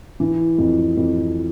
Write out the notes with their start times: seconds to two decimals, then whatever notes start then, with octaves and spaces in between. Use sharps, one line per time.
0.20 E3
0.58 F2
0.97 F2